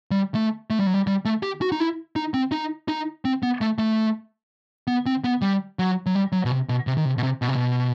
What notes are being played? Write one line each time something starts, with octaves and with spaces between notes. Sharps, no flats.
G3
A3
A3
G3
F#3
G3
G3
A3
G4
F#4
D#4
E4
D#4
C4
D#4
D#4
C4
B3
A3
A3
B3
C4
B3
G3
F#3
F#3
G3
F#3
B2
C3
B2
C3
D#3
C3
B2
C3
B2
C3
B2